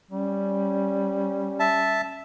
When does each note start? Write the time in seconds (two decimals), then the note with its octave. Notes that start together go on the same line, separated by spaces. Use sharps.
0.11 G3 C#4
1.60 E5 A5